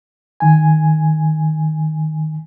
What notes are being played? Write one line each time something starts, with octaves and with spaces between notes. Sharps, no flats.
D#3 G#5